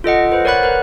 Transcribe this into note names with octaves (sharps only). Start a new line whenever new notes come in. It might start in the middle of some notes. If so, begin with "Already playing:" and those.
F4 A4 D#5 F#5
B4 C5
A#4 C#5 D5 F#5 B5 F#6
A#4 B4